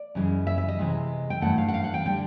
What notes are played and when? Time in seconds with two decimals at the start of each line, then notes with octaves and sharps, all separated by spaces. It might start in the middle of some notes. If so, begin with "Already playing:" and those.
Already playing: D5
0.15 F#2 C#3 E3 G#3
0.47 E5
0.58 E5
0.68 D#5
0.79 C3 E3 G#3
1.30 G5
1.41 G2 E3 A3 F#5
1.58 F5
1.68 F#5
1.74 F5
1.84 F#5
1.94 G5
2.06 D3 G3 G5